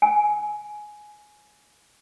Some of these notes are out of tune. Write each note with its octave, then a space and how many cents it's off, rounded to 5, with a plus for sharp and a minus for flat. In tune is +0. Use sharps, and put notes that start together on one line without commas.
G#5 +10